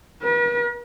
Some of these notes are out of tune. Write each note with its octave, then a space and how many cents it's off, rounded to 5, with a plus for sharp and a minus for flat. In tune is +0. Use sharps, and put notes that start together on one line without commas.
B4 -45